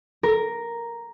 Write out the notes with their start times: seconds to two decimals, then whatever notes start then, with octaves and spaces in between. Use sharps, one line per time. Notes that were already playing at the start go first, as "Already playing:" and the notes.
0.23 A#4